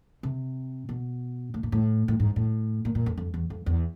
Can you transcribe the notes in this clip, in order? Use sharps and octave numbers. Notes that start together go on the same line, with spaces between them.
C3
B2
A2
A#2
A2
A2
G#2
A2
A#2
A#2
F2
F2
E2
F2
E2